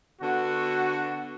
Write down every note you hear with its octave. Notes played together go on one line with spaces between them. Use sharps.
D3 B3 F#4